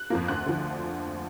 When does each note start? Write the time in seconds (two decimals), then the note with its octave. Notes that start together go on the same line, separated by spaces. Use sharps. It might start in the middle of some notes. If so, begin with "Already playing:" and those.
Already playing: F#6
0.10 F2 F3 A#3
0.28 D2 F#6
0.46 D3 F3